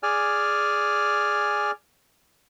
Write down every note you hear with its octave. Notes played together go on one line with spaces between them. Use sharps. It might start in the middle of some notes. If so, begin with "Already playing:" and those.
G#4 D5 G#5 F6